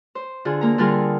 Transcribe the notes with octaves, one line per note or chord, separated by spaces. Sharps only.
C5
D3 F4 G#4
A#3 A#5
D3 G3 F4 G#4 A#4 C6